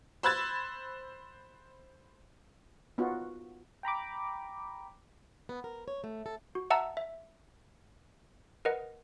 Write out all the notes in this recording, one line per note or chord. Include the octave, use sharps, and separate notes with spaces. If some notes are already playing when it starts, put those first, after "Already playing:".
C5 B5 E6 F#6 G#6 A6
B3 D#4 F4 F#4
G5 A#5 B5 D6
B3
A#4
C#5
A3
A4
F#4
E5 F#5 A5 A#5 E6
E5
A#4 B4 D#5 F#5